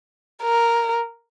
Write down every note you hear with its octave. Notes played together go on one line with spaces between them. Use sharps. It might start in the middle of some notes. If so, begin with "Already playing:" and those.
A#4